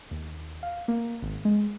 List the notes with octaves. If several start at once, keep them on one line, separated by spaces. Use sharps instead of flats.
D#2
F5
A#3
G#1
G#3